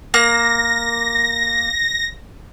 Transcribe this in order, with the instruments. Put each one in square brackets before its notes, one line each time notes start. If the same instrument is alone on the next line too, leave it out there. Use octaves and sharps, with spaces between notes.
[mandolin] A#3 [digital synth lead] A#6